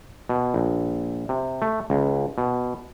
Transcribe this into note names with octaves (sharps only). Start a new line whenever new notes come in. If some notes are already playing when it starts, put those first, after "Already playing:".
B2
A#1
C3
A3
C#2
B2